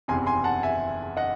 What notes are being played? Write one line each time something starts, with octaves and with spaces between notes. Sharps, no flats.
F#1 E2 C3 G#5 C6
G#5 C6
F#5 A5
E5 G#5
D#5 F#5